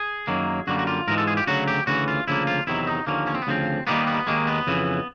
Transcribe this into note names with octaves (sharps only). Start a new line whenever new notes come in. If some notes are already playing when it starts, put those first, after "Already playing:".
Already playing: G#4
F#2 D#3 F#3 A#3
F#2 D3 G3 A#3 F#4
F#4
F4
G#2 E3 G#3 A#4
A4
G#4
G4
D2 C#3 F#3 F#4
G4
D2 C#3 E3 F#4
F4
D2 C#3 F3 A#3 E4
F4
E2 C3 D#3 F#3 E4
D#4
D#2 D3 F3 A#3 C#4
C#4
C4
B3
D2 C#3 F3 C4
D#2 D#3 G3 A#3 B3
B3
D#2 D#3 G#3 A#3
B3
F2 C#3 E3